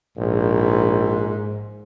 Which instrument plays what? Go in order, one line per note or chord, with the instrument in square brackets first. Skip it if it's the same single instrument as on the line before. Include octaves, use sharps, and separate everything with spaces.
[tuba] A#1 [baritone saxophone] G#2